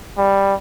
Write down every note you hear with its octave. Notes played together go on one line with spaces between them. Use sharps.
G3